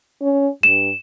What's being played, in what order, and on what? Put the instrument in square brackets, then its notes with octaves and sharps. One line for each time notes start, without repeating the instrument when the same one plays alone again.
[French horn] C#4
[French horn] G2 [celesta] E7